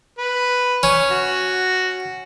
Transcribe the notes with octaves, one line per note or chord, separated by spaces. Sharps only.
B4
C#4
F#4